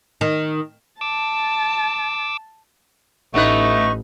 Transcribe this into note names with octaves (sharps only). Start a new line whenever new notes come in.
D#3
A5 D6 E6
A1 A3 B3 D#4 B4 C#6